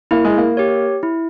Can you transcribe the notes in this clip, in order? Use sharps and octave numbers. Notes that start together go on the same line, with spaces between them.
A#3 E4
G#3
A#3
G4 C#5
E4